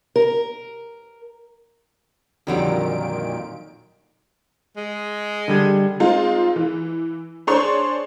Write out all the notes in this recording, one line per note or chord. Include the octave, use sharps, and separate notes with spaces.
A#4
F2 A#2 D3 D#3 F#3 G3 A#4 D7
G#3
D3 G3 G#6
G#3 C4 D#4 F4
E3
D4 G#4 C5 C#5 C6